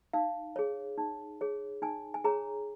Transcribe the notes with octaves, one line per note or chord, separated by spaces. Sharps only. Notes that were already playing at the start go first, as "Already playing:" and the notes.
D#4 F5
G#4 C#5
D#4
G#4 C#5
D#4 G#5
G#5
G#4 C#5 A#5